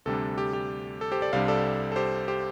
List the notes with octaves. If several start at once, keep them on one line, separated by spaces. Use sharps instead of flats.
D2 C3 G3 D4 A4
G4
G4
A4
G4 C5
A4 D5
C2 C3 G3 D4 C5 F5
A4 D5
A4
G4 C5
G4 C5